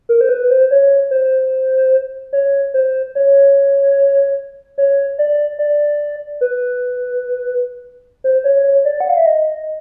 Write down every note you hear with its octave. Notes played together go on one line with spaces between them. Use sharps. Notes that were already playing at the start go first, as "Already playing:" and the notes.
A#4
C5
B4
C5
C#5
C5
C#5
C5
C#5
C#5
D5
D5
B4
C5
C#5
C#5
D5
F#5
F5
E5
D#5